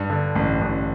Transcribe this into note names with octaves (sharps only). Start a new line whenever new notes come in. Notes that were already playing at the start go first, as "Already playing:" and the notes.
Already playing: G2
D3
A1
A1